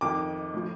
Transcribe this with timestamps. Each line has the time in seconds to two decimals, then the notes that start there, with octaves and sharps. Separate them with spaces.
0.01 F2 D#3 D6
0.53 A2 F3